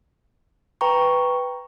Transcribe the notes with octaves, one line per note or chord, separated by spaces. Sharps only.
B4 G5 A#5 C#6